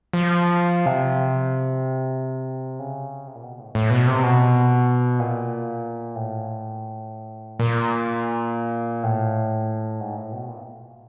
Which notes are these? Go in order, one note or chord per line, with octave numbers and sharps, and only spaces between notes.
F3
C3
C#3
C3
A#2
B2
A2
A2
B2
C3
B2
A#2
A2
A#2
A2
G#2
A2
B2
A#2